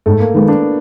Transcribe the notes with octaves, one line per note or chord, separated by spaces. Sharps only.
G#2 A3
A#3
D#3 G#3 B3
D4